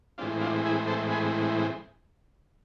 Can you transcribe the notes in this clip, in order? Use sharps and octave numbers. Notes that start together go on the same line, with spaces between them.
A2 E3 G#3 C4 D4 F4
D4 F4
E4 G#4
A4 C5
G#4 B4